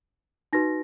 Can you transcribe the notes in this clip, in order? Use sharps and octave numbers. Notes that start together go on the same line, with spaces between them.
D#4 F#4 B4 A#6